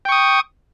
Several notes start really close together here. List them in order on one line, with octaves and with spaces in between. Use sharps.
G5 C#6 D#6